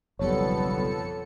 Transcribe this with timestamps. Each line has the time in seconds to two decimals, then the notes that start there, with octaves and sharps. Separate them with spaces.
0.19 F#1 B1 F2 G3 B3 A4 C#5 C#7